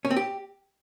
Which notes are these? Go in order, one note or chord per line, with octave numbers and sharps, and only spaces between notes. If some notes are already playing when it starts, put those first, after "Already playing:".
C#4
C4
G4